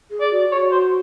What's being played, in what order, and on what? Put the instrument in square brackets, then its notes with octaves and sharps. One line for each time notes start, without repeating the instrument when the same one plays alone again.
[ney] G#4
[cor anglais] D5
[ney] F#4
[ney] F#4 [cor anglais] C#5
[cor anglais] C5